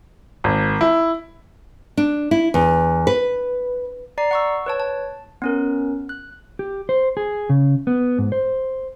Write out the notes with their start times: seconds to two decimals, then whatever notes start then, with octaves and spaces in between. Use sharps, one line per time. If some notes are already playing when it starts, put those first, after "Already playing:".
0.44 G#1
0.81 E4
1.97 D4
2.31 E4
2.54 E2
3.07 B4
4.18 D5 A#5 C7
4.31 F#5 C#6 E6
4.66 B4 C#5 A5
4.80 A5
5.42 B3 C#4 A#4
6.09 F#6
6.59 G4
6.89 C5
7.17 G#4
7.50 C#3
7.87 B3
8.18 G#2
8.32 C5